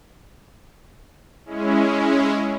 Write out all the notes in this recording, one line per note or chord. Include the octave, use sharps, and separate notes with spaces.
G#3 C#4 E4